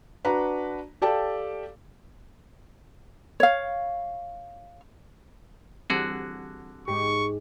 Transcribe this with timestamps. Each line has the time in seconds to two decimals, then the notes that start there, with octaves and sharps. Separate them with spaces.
0.25 D4 F#4 B4 A#5
1.02 G4 A4 D5 F5 G5 A5
3.40 C#5 F5
5.90 D3 E3 G3 C4 F#4 G#4
6.88 G#2 G#3 G4 C#6